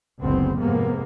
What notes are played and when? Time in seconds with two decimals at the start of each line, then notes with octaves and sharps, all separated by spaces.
0.21 F#1 C#2 D3 B3 C4
0.58 F2 G#2 C3 A#3 B3